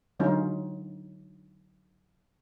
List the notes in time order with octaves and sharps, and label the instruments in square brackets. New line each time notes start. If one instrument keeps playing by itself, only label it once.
[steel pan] D3 F#3 G#3 C#4 D#4 F4